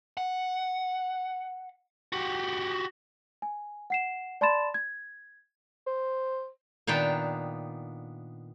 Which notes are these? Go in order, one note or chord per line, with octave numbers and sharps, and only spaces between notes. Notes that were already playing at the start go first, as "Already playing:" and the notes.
F#5
F#4 G4
G#5
F#5 C7 E7
D5 A5 B5 C6 A6 E7
G#6
C5
A#2 D#3 B3 D4 G5